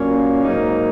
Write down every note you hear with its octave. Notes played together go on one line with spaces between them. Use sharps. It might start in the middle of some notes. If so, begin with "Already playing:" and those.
Already playing: A#2 F#3 A#3 C#4
G#2 F#3 A#3 D#4